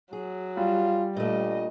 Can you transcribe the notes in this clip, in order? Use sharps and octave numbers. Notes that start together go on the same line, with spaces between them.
F#3 G#4
G3 F4
G2 A#2 A3 D#5